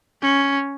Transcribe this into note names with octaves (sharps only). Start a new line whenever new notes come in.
C#4